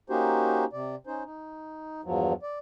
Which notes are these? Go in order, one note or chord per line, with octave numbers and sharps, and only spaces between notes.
A#3 C#4 D#4 F#4 G4 C5
C3 D5
C#4 D#4 C5
D#4
E2 G2 F3 F#3
D5